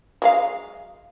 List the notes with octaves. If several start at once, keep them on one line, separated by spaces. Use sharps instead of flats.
F#3 G#3 F5